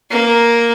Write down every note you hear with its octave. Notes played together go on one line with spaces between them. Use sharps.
A#3